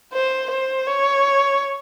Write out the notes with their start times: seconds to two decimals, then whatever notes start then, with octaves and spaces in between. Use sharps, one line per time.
0.13 C5
0.51 C5
0.87 C#5